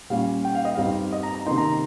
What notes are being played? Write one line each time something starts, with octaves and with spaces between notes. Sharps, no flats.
A#2 G3 C#4 F5
G5
F5
D#5
G2 G3 C4 D#4 F5
D#5
A#5
A#5
C3 D#3 A#3 D#4 C6
A#5